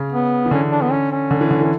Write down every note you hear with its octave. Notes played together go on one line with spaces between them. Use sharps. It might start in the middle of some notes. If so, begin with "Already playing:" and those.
Already playing: C#3
B3
E3
D3 C#4
D4
B3
C#4
C#4
D3
E3
D3
E3 C#4